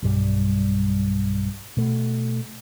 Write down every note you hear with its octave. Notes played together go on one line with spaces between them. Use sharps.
B1 G2 G3
B2 A3